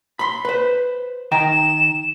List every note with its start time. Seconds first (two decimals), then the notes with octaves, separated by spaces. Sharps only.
0.19 B5 C6
0.45 B4 C5
1.32 D#3 G5 A#5 E7